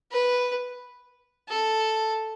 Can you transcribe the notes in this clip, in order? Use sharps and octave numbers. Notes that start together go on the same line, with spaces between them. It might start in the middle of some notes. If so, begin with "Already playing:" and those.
B4
A4